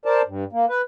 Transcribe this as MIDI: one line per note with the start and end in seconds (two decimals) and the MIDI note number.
0.05 0.22 70
0.05 0.22 72
0.05 0.22 74
0.05 0.22 81
0.27 0.44 43
0.52 0.65 58
0.69 0.81 71